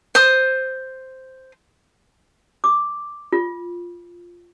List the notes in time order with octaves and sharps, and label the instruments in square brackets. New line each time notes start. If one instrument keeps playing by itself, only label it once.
[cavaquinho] C5 D#6
[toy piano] D6
F4